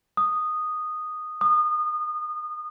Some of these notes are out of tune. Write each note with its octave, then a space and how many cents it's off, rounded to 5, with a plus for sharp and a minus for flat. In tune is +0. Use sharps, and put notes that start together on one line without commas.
D#6 -10
D#6 -30